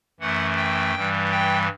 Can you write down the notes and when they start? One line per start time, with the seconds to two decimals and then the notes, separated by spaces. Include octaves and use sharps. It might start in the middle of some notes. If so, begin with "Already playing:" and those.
0.20 F#2 E3 A3 F#5
0.57 G5
0.94 G2 E3 G3
1.32 G5